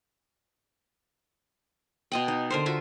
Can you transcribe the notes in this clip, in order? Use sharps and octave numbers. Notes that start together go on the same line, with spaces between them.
B2 D#5 G5
D#4
D3 A#4 C5
F4 F#4 E5